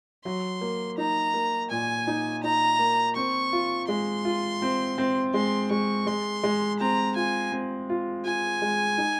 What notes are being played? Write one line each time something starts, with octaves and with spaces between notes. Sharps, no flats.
F#3 C6
A#3
D#4 A#5
A#3
A#2 G#5
D#4
D#4 A#5
A#3
C4 C#6
F4
G#3 C6
F4
C4
C4
G#3 C6
G#3 C#6
G#3 C6
G#3
C4 A#5
F4 G#5
C4
F4
F4 G#5
G#3
D#4